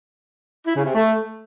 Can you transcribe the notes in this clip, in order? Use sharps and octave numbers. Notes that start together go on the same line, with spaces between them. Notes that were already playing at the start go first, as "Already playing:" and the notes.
E4
C#3
C3
A3